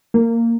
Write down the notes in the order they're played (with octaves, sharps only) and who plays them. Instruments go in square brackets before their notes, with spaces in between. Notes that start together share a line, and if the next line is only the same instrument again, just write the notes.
[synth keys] A#3